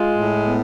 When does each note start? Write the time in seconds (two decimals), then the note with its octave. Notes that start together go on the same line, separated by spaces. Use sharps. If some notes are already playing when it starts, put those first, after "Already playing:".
Already playing: G#3 F4
0.15 A2
0.45 B3